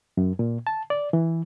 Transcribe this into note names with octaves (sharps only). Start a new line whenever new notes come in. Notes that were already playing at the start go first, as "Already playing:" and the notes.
F#2
A#2
A5
D5
E3